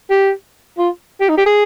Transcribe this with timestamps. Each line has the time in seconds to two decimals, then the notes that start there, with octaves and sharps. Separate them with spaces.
0.10 G4
0.78 F4
1.21 G4
1.29 D#4
1.38 G4
1.46 G#4